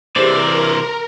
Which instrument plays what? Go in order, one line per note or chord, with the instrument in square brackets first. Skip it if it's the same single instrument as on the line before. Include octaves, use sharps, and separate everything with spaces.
[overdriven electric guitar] C3 E3 [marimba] G4 G#4 C5 [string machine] A#4 [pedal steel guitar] D5